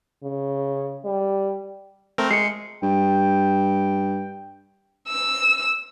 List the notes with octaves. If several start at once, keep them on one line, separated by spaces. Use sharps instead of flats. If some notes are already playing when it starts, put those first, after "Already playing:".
C#3
G3
A3 C4 A#4
G#3 C7 C#7
G2 G5
E6